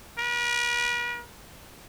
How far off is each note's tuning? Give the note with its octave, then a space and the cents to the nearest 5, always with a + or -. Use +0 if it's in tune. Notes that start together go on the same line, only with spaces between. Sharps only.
B4 -45